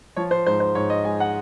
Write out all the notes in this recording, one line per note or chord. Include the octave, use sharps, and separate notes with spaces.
F3 C#5
C5
G#2 C5
C5
G#2 C#5
D#5
G#3 G#5
F#5